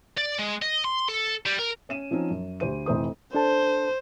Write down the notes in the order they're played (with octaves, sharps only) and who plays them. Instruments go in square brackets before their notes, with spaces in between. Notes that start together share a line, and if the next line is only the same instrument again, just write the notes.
[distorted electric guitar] D5
G#3
D#5
C6
A4
G3
A#4
[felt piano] C#4 D#7 E7
F3 C4 C#4 D#4
F#2
D2 G4 C5 D#7
F1 E3 C5 D#6
[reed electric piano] D4 A4 A5 [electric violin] C5